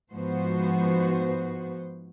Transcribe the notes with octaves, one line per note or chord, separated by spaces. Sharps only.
G#2 F3 B3 F#4 C5